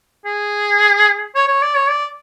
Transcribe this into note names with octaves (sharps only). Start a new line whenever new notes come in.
G#4
C#5
C#5
D5
C#5
D5